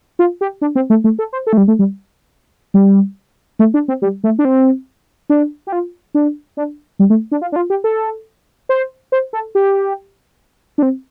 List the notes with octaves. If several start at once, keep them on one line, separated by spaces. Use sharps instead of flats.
F4
G4
D4
C4
A3
A3
A4
C5
A4
A3
G3
A3
G3
G3
A3
D4
C4
G3
A3
D4
C4
D4
G4
F4
D4
D4
G3
A3
D4
F4
D4
F4
G4
A4
C5
C5
A4
G4
D4
C4